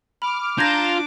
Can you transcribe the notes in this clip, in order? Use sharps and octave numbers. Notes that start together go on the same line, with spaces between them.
B5 D6 F6
D4 F4 A#5 D6 G6 G#6 A#6 E7